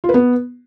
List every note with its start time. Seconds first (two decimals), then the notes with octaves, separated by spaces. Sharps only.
0.04 F4
0.09 B4
0.14 B3